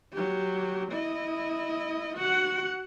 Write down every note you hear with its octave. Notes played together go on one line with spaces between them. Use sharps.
F#3 G4
E4 D#5
F#4 F#5